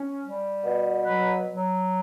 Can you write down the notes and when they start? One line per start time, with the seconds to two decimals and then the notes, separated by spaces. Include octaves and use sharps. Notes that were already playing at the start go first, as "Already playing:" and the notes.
Already playing: C#4
0.23 G3
0.64 B2
1.06 F#3 B4
1.48 F#3